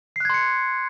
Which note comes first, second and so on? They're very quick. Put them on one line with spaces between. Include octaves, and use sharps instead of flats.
C7 F#6 G#6 C6 C#7